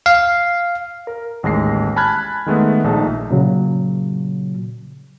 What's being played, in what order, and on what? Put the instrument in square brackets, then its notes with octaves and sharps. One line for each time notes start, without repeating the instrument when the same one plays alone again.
[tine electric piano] F5
[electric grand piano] A#4
A1 D#2 G#3 A#6 C7
G#5 A5 B5 F6 F#6 G#6
D#3 G#3 A3 B3
A#1 A3 D#4 G#4 A5
[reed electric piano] A#2 C#3 F#3